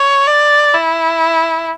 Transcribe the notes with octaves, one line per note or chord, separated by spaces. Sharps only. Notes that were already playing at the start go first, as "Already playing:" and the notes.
Already playing: C#5
D5
E4